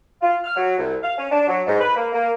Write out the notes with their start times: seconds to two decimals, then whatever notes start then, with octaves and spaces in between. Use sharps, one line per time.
0.22 F4
0.44 F6
0.56 F#3
0.78 C2
1.03 F5
1.18 C#4
1.31 D4
1.48 F#3
1.67 G#2
1.80 B4
1.96 A#3
2.13 A#3